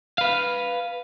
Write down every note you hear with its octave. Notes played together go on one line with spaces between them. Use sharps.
B4 F5